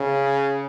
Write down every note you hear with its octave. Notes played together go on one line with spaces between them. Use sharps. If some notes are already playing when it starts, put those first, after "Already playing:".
Already playing: C#3